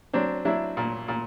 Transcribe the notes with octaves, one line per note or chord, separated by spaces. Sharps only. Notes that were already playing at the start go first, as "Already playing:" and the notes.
F#3 C4 D4
F#3 D4 E4
A#2
A#2